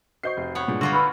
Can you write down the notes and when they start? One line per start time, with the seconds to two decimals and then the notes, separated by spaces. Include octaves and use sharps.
0.24 F#4 C5 D#5 C#6 G6 C7
0.37 F1
0.55 B3 C#5
0.68 G2 A#2 G#3 D4
0.81 D3 A#3 F4 F#4
0.93 B4 C#6 E6 F6